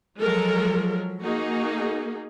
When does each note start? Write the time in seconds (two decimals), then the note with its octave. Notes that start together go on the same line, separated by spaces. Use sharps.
0.19 F3 F#3 G#3 A4 A#4
1.23 A#3 D#4 F#4 G#4